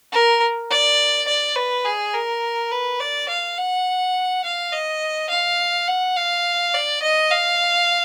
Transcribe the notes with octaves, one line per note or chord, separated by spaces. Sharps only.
A#4
D5
D5
B4
G#4
A#4
B4
D5
F5
F#5
F5
D#5
F5
F#5
F5
D5
D#5
F5